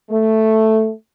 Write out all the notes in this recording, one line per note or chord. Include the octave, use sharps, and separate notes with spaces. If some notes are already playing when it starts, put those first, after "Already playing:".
A3